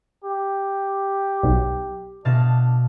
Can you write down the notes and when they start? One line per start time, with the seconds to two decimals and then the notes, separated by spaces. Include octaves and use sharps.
0.24 G4
1.43 B1
2.25 B2 D4 F5 A5